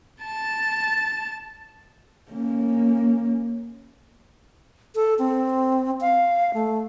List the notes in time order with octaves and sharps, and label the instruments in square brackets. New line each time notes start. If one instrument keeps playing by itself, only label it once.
[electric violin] A5 A6
[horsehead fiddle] A#3 C#4
[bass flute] A4
C4
F5
A3